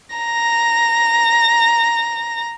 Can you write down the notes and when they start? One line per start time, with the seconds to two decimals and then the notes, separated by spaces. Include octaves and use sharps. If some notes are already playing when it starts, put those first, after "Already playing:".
0.15 A#5 A#6